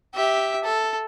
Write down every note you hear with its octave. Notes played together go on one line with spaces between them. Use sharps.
G4 E5
A4